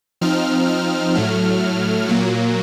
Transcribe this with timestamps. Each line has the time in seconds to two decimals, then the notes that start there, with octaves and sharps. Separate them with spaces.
0.21 F3 C4 D#4 F6
0.69 F6
1.15 A2 F#3 A3
2.09 A#2 F#3 A#3